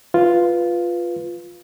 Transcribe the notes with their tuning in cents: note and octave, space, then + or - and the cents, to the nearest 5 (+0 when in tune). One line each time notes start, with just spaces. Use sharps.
F4 +0 B4 +0